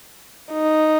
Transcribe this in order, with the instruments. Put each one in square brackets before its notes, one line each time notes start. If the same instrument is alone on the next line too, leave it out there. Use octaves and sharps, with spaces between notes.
[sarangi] D#4